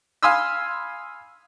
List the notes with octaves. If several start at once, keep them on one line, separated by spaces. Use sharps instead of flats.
F5 G#5 B5 C6 D#6 E6